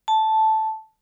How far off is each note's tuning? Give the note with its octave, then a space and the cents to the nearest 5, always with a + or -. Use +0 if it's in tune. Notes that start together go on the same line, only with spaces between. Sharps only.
A5 -5